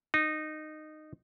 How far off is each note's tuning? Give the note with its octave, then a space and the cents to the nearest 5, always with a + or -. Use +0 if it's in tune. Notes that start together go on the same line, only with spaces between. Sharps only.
D#4 -15